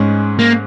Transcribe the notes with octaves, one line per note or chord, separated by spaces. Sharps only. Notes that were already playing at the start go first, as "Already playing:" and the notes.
Already playing: G#2 G#3 C#4
A#3